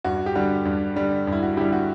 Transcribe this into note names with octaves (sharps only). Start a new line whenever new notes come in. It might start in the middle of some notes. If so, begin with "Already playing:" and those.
G2 F#4
G4
D3 G3 F#4
G2
D3 G3
G2
E4
F#4
D3 G3 E4 G4
F#4